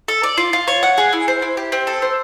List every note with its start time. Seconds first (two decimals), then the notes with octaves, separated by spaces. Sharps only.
0.08 A4
0.23 D5
0.38 F4
0.53 F4
0.68 C#5
0.83 F#5
0.98 G#4
1.13 E4
1.28 C5
1.42 E4
1.57 G4
1.72 C4
1.87 A4
2.02 C5